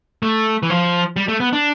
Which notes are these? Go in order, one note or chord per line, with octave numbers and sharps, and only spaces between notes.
A3
E3
F3
G3
A3
B3
D4